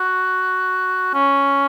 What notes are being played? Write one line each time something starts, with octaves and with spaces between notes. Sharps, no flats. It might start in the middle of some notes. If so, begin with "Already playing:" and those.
Already playing: F#4
C#4